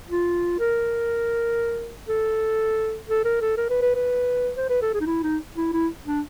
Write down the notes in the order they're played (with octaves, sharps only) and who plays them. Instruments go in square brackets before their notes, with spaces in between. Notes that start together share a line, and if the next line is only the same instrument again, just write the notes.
[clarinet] F4
A#4
A4
A4
A#4
A4
A#4
B4
B4
B4
C5
B4
A4
G#4
D#4
E4
D#4
E4
E4
D4